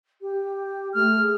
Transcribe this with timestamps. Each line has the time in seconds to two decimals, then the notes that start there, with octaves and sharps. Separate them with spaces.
0.21 G4
0.94 A3 F6
1.19 G#4